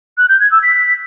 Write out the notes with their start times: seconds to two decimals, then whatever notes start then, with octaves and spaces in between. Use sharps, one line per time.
0.18 F#6
0.29 G6
0.40 G#6
0.52 E6
0.63 B6